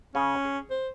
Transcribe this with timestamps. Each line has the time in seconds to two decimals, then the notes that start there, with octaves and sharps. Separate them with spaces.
0.15 C#3 C#4
0.45 G#4
0.70 C5